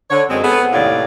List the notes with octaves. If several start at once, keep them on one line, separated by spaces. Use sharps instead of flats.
D3 C#5
F#2 G#3 C4
B3 G#4 A4
D#2 A2 C3 C#5 D5 F5